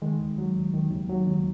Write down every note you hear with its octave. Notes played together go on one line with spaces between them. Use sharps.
D#3 G#3
D#2
F#3
D#2
D#3
D#2
F#3
D#2